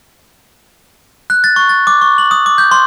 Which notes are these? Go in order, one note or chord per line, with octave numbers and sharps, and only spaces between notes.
F#6
A6
C#6
A6
D6
C#6
F#7
D#6
D6
G6
C6